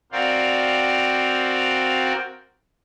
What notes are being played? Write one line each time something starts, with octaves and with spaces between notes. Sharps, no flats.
C4 F#4 A#4 D5 F5 G5